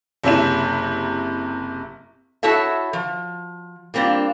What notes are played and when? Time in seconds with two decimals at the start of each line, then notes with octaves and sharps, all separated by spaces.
0.24 F#1 C3 E4 E7
2.43 E4 F#4 A4 C#5 E5
2.93 F3
3.94 G3 A#3 C4 D4 F4